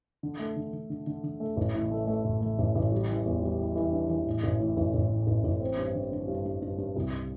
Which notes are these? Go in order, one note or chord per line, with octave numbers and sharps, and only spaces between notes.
D3
A3
D3
D3
D3
D3
D3
A3
A1
A2
A3
A3
A1
A3
A1
A1
G3
E3
E2
G3
E3
E3
D4
E3
A2
A1
A2
A1
A1
A2
A1
A1
C4
G2
D3
D3
G2
G2
G2
G2
C2